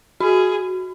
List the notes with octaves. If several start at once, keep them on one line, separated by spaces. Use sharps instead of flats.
F#4 G#4